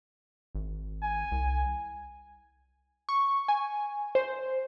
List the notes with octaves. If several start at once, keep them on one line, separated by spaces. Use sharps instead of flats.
G#1
G#5
C2
C#6
G#5
C5